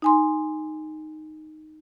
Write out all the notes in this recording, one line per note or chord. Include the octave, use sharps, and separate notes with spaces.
D#4 G#5 C6